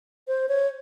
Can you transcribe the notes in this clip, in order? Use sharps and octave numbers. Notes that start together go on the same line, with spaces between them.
C5
C#5